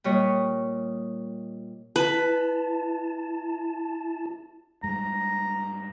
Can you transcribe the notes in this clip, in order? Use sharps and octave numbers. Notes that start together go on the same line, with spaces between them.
A#2 G3 C#5 D#5
E4 B4 A5
G2 G#3 A#5